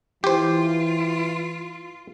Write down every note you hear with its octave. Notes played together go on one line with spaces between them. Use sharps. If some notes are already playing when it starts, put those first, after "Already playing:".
E3 F4 G4 C5